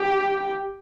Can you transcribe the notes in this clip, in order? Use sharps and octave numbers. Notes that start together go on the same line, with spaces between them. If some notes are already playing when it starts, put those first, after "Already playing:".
Already playing: G4